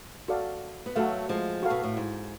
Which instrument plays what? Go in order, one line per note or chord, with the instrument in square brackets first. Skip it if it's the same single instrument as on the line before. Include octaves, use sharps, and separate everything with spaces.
[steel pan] F#4 A4 D5 F5
[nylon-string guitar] B3
[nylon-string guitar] F#3 A3 [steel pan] F#4 A4 F5
[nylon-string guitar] F3 G#3
[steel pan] F#4 A4 F5
[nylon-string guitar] B2
A2
G#2